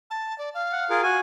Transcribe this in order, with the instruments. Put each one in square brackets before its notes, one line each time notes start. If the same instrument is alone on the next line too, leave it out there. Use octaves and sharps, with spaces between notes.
[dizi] A5
D5
F5
[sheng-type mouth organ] F#5
F4 G#4 A#4
F#4 G#5